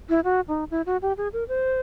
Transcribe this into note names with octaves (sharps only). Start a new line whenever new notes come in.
E4
F#4
D#4
E4
F#4
G4
G#4
A#4
C5